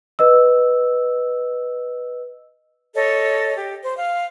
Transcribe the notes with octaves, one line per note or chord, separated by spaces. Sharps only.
B4 D#5 E6
A4 C#5 D#5
G4
C5
F5